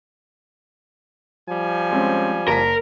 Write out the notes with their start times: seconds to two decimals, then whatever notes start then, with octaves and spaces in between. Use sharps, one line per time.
1.49 F3 G3 G#5
1.91 G#3 C4 C#4
2.48 F#1 A#4 A5 B6